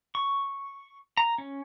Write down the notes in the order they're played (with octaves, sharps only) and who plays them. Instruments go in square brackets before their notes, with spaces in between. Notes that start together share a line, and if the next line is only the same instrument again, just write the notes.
[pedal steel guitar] C#6
A#5
C#4